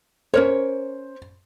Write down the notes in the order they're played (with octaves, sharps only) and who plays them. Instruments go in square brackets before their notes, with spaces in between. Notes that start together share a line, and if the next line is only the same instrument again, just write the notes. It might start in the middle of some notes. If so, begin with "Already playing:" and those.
[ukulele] C#4 A#4 C#5 [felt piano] C5